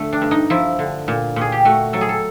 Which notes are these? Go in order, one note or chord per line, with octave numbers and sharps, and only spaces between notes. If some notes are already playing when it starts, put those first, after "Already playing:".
Already playing: D3 F3 A3
D4
G2
D#4
F3 E4
D3
A#2
A#2 G#4
G4
A3 F#4
F#3 A4
G#4
A4